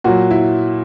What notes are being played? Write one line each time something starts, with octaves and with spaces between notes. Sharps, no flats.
A#2 F#3 F#4
E4